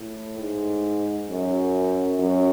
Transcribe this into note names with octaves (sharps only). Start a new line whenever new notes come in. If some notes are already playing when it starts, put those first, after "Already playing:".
Already playing: A2
G#2
F#2
F#2